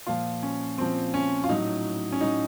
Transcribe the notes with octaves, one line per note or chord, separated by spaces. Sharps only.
A#2 F3 F4
C#4
A#2 F3 C4
C#4
F4
A2 F#3 D#4
C#4
A2 F#3 D#4